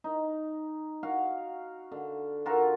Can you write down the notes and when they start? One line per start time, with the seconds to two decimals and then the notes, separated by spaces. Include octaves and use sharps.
0.04 D#4
1.03 F#4 F5
1.92 D3
2.46 F4 F#4 A4 A#4